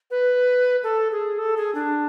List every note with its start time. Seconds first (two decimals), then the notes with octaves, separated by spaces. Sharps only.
0.11 B4
0.84 A4
1.12 G#4
1.38 A4
1.57 G#4
1.75 D4